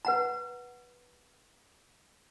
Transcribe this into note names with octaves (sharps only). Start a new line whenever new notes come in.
B4 F#5 A#5